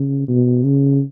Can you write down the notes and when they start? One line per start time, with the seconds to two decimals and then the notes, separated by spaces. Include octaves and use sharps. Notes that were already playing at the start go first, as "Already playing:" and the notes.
Already playing: C#3
0.28 B2
0.64 C#3